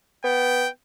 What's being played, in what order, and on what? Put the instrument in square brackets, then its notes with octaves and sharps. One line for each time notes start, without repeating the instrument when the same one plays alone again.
[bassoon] B3 [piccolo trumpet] G5